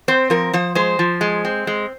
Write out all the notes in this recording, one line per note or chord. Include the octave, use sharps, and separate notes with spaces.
C4 C5
F3 A#4
F3 C5
G#3 C5
F3
G#3
C4
G#3